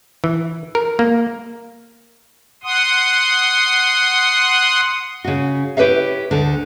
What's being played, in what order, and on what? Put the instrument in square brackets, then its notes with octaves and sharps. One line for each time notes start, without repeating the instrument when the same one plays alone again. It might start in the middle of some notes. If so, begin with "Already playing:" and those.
[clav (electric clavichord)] E3
A#4
A#3
[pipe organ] F#5 C6 D#6
[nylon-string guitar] C#3 F#4
E4 G4 B4 C#5 E5 F5
D2 D3